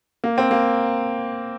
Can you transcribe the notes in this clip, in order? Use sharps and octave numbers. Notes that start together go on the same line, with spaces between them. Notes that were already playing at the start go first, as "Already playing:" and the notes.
A#3
C4
A#3